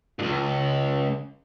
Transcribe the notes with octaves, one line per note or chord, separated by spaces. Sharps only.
C#2 G2